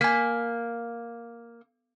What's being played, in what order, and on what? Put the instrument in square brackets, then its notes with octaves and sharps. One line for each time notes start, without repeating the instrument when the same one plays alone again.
[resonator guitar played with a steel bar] A#3 [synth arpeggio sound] G#5 B6